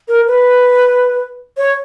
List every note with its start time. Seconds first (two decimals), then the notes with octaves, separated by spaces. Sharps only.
0.08 A#4
0.27 B4
1.57 C#5